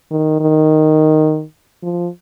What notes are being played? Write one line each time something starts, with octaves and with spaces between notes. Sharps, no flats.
D#3
D#3
F3